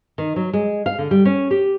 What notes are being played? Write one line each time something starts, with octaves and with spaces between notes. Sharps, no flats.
D#3
F#3
G#3
F5
D3
G3
C#4
G4